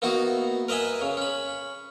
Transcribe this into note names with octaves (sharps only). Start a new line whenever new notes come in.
A#3 B3 D#4 E4 F#4
A#4 B4 D#5 E5 G#5
C#3
C#4 B5